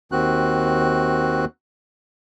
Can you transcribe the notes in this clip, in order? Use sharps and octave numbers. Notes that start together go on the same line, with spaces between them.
D#2 D#3 C4 F#4 F#6